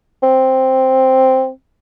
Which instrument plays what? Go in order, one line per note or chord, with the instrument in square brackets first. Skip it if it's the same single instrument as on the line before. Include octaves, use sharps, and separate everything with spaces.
[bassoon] C4